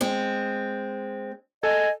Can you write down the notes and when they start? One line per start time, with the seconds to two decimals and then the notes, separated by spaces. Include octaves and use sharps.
0.01 G#3 C4
1.63 A4 D#5 G#5